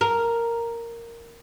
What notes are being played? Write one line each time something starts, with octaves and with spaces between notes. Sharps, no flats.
A#4